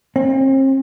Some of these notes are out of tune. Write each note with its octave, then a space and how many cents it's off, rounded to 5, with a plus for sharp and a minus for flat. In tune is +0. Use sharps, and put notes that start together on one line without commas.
C4 +40